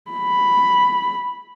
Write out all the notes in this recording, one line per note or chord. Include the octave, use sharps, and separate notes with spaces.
B5